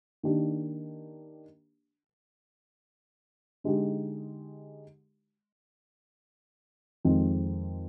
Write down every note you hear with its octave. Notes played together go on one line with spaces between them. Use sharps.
D#3 A#3 D4 G4
D3 G#3 D#4 G4
F2 D#3 G#3 C4